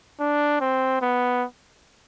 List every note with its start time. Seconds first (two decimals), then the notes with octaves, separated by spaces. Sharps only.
0.21 D4
0.61 C4
1.02 B3